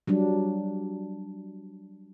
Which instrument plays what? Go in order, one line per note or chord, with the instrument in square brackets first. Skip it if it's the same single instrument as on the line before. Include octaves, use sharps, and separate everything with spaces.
[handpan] F#3 G3 D4